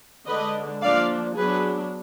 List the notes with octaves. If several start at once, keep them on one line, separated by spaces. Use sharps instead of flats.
D3 G#3 D4 B4 D#5
F3 A#3 D4 D5 F5
F#3 B3 D4 G#4 B4